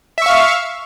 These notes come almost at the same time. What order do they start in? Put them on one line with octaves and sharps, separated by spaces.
E5 C#6 F5